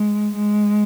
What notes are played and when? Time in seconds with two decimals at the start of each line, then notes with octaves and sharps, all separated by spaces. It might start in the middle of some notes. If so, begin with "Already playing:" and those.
Already playing: G#3
0.35 G#3